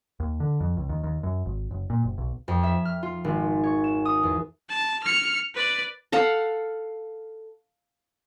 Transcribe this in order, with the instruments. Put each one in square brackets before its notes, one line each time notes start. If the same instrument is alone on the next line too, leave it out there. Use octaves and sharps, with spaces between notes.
[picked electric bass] D#2
D3
F2
C#2
D#2
D#2
F#2
G#1
F#1
A#2
F#1
B1
[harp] F2
E5
F6
F4
G#1
C#5
E7
D#6
E2
[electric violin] A5
F6 C#7
B4 D5
[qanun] A4 F5 F#5